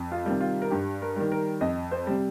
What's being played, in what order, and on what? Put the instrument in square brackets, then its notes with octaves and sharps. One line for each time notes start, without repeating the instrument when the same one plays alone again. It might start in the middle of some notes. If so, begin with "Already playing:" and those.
Already playing: [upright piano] F2
F4
C3 D#3 G3
F4
A#4
G2 G4
A#4
D#3 G3
A#4
F2 D#5
C5
C3 G3